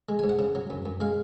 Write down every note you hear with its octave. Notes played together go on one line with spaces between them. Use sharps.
G#3
G#5
G#2
F#5
C#3
F#3
F#2
F#2
G#3 F5